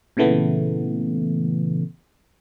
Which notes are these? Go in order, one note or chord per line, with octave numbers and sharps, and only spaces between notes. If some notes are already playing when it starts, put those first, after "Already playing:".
A#2 C#3 E3 A3 B3